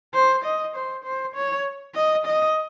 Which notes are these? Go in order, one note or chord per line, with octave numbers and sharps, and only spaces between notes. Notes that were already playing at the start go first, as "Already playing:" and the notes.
C5
D#5
C5
C5
C#5
D#5
D#5